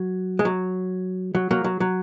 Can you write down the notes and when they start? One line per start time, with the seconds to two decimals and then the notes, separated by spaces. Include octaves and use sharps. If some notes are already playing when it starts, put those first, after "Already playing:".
Already playing: F#3
0.39 G#3
0.45 F#3
1.35 F#3
1.51 F#3 A#3
1.64 F#3
1.80 F#3